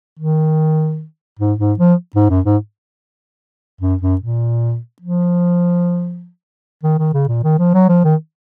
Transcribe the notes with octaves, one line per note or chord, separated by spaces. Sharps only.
D#3
G#2
G#2
F3
G#2
F#2
G#2
F#2
F#2
A#2
F3
D#3
D#3
C#3
A#2
D#3
F3
F#3
F3
D#3